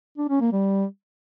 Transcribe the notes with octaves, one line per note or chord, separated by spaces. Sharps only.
D4
C#4
A#3
G3